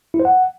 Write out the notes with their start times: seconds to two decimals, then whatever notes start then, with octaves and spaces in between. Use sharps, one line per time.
0.14 E4
0.20 C5
0.25 F#5